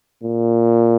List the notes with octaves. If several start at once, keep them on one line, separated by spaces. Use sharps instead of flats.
A#2